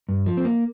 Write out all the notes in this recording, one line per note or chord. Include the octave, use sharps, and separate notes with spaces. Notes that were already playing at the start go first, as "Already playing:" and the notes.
G2
F3
C4
A#3